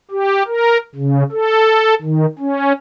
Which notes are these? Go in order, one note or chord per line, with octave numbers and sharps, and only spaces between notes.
G4
A#4
C#3
A4
D#3
C#4